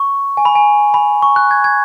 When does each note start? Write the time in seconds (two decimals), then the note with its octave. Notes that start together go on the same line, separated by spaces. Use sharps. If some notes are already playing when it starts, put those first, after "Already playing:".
Already playing: C#6
0.37 G#5
0.45 B5
0.55 G#5
0.94 B5
1.22 C#6
1.36 F#6
1.51 G#6
1.64 G#6